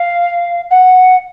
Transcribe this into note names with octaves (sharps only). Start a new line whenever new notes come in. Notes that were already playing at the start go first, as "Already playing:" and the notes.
Already playing: F5
F#5